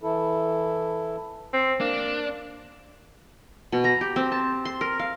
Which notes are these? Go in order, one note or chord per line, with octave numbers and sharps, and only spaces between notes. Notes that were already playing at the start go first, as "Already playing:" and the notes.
E3 E4 A4
C4
A#3 D4
B2
A#5
G4
C4
A5
C6
A#4
F5